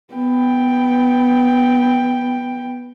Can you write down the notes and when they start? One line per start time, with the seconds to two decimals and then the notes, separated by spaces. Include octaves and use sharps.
0.14 B3 G5